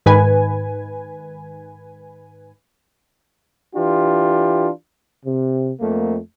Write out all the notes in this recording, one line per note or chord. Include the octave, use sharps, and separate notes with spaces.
G#2 D#3 B4 G#5
E3 D4 F4 G4
C3
F2 A3 A#3